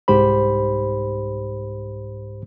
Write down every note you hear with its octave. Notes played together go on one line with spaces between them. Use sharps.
C2 G#2 G4 C5 B5